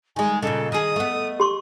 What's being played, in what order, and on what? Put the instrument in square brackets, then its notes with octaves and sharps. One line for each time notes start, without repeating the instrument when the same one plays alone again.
[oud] D#3 G#3 [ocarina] G#5
[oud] A#2 C#3 [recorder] A4 [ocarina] D#5
[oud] D#3 G#4 [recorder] D#6
[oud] A3 B3
[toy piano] G4 C6 C#6